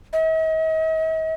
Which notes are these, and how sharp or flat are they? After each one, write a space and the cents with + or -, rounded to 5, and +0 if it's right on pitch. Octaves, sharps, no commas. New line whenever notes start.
D#5 +45